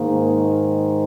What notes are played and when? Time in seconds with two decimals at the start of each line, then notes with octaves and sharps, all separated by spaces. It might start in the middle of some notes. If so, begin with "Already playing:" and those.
Already playing: G#2 D#3 A#3